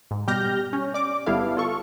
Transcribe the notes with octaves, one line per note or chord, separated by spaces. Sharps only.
G#2
B2 G3 G4 F6 G6 A#6
C#4
D5 D6
G1 G3 B3 E4 A4 F5
F4 A4 C#6